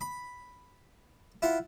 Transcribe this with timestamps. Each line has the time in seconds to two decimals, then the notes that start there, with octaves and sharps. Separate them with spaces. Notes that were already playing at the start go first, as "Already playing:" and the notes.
0.01 B5
1.42 E4 F4 F#5